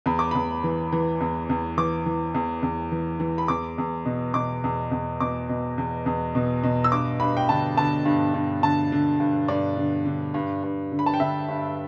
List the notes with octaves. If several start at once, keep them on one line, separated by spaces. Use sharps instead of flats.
E2 B5
D6
E2 B5
E3
E3
E2
E2
E3 D6
E3
E2
E2
E3
E3
B5
E2 D6
E2
B2
B2 D6
E2
E2
B2 D6
B2
E2
E2
B2
B2
E6
G2 D6
G2 B5
G5
D3 A5
D3 A5
G2
G2
D3 A5
D3
G2
G2 D5
D3
D3
G2
G2
D3
B5
A5
G5
D3 E5
G2